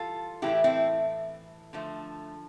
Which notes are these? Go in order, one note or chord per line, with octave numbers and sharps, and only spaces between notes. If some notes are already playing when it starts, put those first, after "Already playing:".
Already playing: E3 G3 F4 A4
A2 E3 A3 E4 G4
C4 E4
D3 F3 A3